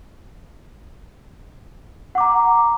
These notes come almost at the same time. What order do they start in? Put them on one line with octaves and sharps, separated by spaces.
F#5 D6 A#5